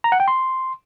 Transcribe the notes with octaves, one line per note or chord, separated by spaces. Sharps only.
A#5
F#5
G5
C6